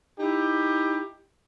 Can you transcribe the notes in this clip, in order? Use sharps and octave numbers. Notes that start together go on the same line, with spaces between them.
D#4 E4 G4